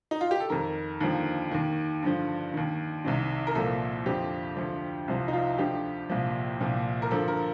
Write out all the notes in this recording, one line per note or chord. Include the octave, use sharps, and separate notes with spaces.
D#4
F4
G4
A4
F2 D#3 A#4
D#2 D3 F3
D#2 D#3
G2 D3 F3
D#2 D#3
C2 C3 D#3
A#4
C2 A#2 F3 A4
F2 D3 F3 G4
D2 D3 F3
C2 C3 F3
D#4
F4
D2 D3 F3 G4
C2 A#2 F3
C2 A#2 F3
A#4
G2 D3 F3 A4
A#4